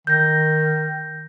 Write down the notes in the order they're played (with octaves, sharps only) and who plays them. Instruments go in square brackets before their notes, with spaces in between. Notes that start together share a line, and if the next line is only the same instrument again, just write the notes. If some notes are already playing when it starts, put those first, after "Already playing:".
[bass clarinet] D#3 [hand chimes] G6 A#6